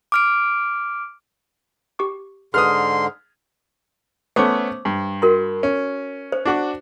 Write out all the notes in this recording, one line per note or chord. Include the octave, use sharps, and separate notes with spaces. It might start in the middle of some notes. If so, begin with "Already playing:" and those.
D6 F6 D7
G4 C#6 D6
G#2 D3 G#4 B4 C6 D#6 F6
A3 B3 C#4 C5 D6
G2
F#4 A#4 C6
C#4
C5
D4 F#4 D6